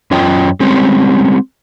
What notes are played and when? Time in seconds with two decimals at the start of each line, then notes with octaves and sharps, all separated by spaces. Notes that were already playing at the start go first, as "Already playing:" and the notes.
0.11 F#2 C#4 F4 D#5 G5
0.60 G3 G#3 C4 C#4